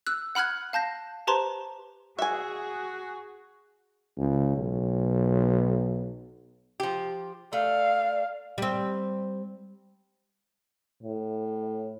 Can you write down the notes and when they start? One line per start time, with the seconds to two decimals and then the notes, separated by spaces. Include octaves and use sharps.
0.07 E6 F#6
0.35 F#5 B5 F6 F#6 G#6
0.73 F5 A5 G6 A#6
1.27 G4 B4 C5 A5 A#5 C6
2.19 F#4 G#4 E5 G#5
4.18 C#2
4.57 B1
6.80 F3 G4
7.53 A3 D5 F5
8.58 G3 C4
11.03 A2